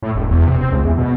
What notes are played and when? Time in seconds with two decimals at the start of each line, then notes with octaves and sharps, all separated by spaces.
0.02 A2
0.15 E1
0.31 E2
0.47 C3
0.61 C4
0.72 C#2
0.85 E2
0.98 B2